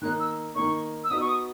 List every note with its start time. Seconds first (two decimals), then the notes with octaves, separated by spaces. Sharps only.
0.02 D#3 A#3 D#4 F#6
0.20 E6
0.55 D#3 A#3 D#4 C#6
1.04 E6
1.10 B3 D#4 F#4 B4 D#5 D#6
1.21 C#6
1.29 D#6